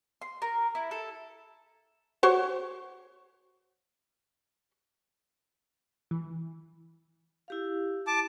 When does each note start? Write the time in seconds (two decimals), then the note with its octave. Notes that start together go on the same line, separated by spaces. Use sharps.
0.21 C6
0.42 A#4
0.75 E4
0.91 A4
2.23 F#4 C5 C#5
6.11 E3
7.48 E4 G4 F5
8.07 A5 D6